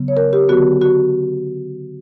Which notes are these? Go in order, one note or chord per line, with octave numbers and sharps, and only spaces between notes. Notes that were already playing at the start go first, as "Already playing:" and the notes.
Already playing: C#3 F#3 B3
C#5
A#4
G4
D3 F#3 B3 F#4
F#4